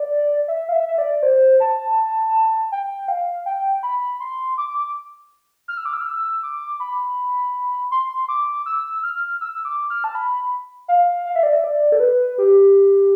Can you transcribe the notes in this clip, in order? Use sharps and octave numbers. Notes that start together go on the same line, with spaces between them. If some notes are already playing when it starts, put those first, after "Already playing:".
Already playing: D5
E5
F5
E5
E5
D5
C5
A5
G5
F5
G5
B5
C6
D6
F6
E6
D6
E6
F6
E6
D6
B5
C6
D6
E6
F6
E6
D6
F6
A5
B5
F5
F5
E5
D5
E5
D5
A4
B4
G4